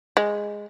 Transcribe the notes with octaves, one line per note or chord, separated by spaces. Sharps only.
G#3